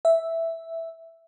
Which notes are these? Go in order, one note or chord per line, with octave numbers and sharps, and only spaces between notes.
E5